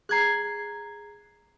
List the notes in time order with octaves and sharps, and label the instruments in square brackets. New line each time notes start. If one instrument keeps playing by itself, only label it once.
[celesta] G#4 A#5 [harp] F#6 G#6 C7